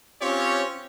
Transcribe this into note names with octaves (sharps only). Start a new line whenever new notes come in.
C4 C#4 F4 G4 C#5